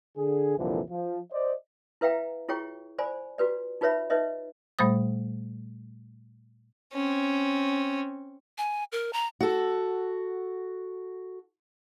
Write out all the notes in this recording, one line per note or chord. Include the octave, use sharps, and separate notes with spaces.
D3 G#4
C2 F2 A#2 D3 E3 F3
F3
C5 D5 D#5
E4 B4 E5 F5 G5 A#5
E4 F4 G#4 C#5 G5 C#6
C5 D5 G#5 B5
F4 F#4 B4 D5
D#4 F4 B4 C#5 E5 B5
D#4 B4 C#5 D#5 E5
A#2 G3 A3 C5 D#6
C4 C#4
G#5
A#4
A#5
F#4 A4